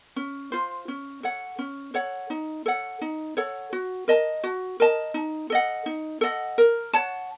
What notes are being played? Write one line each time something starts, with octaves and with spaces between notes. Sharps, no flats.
C#4
F4 C5
C#4
A4 C#5 F#5
C#4
A4 C#5 F#5
D#4
A4 C#5 F#5
D#4
A4 C#5 F#5
F#4
A#4 D#5 A5
F#4
A#4 D#5 A5
D#4
A4 D#5 F#5
D#4
A4 D#5 F#5
A#4
C#5 F#5 A5